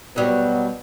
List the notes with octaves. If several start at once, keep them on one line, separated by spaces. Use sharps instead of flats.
B2 F#3 G3